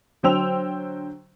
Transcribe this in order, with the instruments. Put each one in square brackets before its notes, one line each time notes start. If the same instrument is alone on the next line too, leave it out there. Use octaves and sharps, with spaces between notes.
[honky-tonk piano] D3 F#3 C5 G5 E6 F7